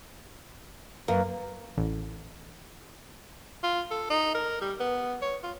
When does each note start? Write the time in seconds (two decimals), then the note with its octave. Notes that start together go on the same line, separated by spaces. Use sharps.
1.08 F#2 A#3 B4
1.78 A1
3.63 F4
3.91 A4
4.10 D#4
4.35 A#4
4.61 G3
4.80 B3
5.22 C#5
5.43 F4